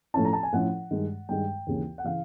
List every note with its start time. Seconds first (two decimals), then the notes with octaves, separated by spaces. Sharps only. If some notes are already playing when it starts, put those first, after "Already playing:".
0.14 A2 F3 A3 C#4 E4 A5
0.25 A#5
0.33 A5
0.43 G#5
0.52 A2 F3 A3 C#4 E4 F#5
0.91 G2 D#3 G#3
1.29 G2 D#3 G#3 G5
1.67 D#2 C#3 E3
1.98 F#5
2.04 C#3 E3 F5